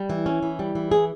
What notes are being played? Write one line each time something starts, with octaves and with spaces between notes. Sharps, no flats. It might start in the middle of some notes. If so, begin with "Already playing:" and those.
Already playing: G3
E3
C#4
E3
G3
E3
G#4